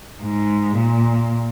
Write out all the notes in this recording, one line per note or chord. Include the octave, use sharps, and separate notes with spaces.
G#2
A#2